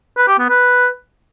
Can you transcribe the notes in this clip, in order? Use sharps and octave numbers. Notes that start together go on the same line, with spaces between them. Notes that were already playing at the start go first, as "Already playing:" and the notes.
B4
G4
B3
B4